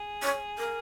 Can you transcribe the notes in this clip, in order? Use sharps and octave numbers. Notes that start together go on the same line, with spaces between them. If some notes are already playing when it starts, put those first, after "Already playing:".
Already playing: G#4
C#5
A#4